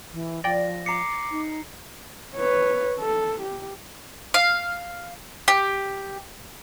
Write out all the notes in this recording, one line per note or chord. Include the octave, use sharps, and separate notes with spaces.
E3
F3 D5 G5 A#6
A#5 D6 C7 C#7
D#4
B4 C#5
A4
G4
F5
G4